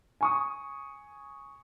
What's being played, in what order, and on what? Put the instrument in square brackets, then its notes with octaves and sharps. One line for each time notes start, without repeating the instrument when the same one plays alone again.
[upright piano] G#5 C#6 D#6